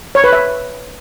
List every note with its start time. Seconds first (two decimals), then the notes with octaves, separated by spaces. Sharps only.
0.15 C#5
0.24 B4
0.33 E5